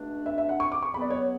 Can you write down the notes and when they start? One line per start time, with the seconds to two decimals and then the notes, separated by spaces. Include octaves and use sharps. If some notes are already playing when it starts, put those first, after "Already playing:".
Already playing: C#2 B2 A3 D4
0.26 E5
0.38 E5
0.49 F#5
0.60 C#6
0.72 D6
0.83 C#6
0.93 C#2 C#3 F#3 B3 B5
1.02 D5
1.10 C#5